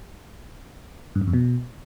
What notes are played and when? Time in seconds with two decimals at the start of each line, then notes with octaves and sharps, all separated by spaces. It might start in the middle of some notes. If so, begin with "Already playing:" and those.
1.15 G2
1.21 F#2
1.27 F2
1.33 B2